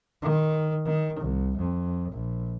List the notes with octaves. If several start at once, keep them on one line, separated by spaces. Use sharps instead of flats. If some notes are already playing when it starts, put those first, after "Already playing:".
D#3
D#3
C2
F2
A#1